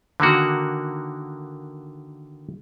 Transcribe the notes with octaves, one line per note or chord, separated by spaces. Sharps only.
D3 D#3 A#3 F#4